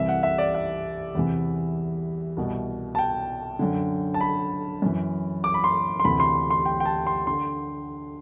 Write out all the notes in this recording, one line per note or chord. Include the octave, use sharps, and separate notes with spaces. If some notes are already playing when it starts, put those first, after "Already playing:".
Already playing: C2 C3 E3 E5
F#5
E5
D5
E5
E2 C3 E3
C2 B2
A5
G5
F#2 D3
A5
B5
F#2 E3
D6
B5
C6
C6
D2 C3 E3 B5
C6
C6
G5
G5
A5
C6
D3 C6